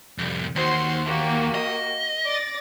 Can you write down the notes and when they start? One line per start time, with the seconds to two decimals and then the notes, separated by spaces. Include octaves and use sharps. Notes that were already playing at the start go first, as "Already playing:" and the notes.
0.18 C2 F2
0.56 D#2 F#4 C5 C6
1.04 A#3 F#4 G4
1.54 D#5
2.26 D5 A6 A#6